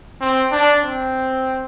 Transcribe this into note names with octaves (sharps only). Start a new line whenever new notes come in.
C4
D4
C4